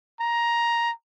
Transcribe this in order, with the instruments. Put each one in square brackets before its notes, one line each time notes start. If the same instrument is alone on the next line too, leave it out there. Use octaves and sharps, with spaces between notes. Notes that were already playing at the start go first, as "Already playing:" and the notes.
[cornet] A#5